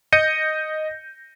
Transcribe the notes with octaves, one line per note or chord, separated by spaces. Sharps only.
D#5 G6 A#6 C#7 D#7